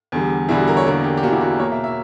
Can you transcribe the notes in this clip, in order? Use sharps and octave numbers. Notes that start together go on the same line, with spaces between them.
E2 D3 G3
E2 D3 G3 E4
F#4
A#4
C#5
E2 D3 A#3 A#4
G4
G4
E2 D3 A#3 F#4
E4
F#4
B2 A#3 C#5
E5
E5